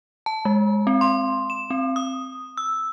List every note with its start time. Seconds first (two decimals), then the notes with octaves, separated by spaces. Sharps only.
0.26 A5
0.45 G#3
0.87 C4
1.01 C6
1.50 E7
1.70 C4
1.96 D#6
2.58 E6